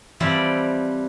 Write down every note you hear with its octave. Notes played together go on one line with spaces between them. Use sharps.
E3 F3 G3 C4 D5